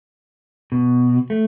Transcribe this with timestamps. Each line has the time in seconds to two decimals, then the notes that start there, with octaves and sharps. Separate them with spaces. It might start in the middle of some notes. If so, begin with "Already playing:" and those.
0.72 B2
1.30 A3